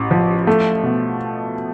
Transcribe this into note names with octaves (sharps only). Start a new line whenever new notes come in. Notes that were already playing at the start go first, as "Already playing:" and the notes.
Already playing: A1
F3
A3
B2